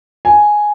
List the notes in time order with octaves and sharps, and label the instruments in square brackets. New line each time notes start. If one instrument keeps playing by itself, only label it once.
[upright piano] G#5